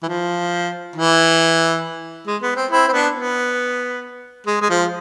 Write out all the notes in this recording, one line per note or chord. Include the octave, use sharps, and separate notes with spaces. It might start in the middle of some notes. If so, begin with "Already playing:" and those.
E3
F3
E3
G#3
B3
C4
C4 E4
C4
B3 D4
B3
G#3
G#3
F3